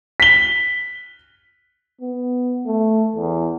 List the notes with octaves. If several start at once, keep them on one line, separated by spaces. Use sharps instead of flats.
B6 G7
B3
A3
E2